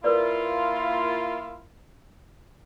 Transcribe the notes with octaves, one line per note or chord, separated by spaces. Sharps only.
A#3 E4 F4 A#4 B4 D5